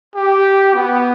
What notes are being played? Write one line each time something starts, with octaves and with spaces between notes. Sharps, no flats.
G4
B3